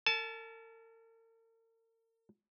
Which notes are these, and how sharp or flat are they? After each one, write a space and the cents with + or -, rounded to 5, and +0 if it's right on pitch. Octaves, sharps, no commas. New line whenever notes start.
A#4 -45 A5 -25